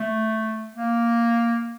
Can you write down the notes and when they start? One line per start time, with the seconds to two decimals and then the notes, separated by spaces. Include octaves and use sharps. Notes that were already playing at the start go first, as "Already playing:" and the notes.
Already playing: A3
0.75 A#3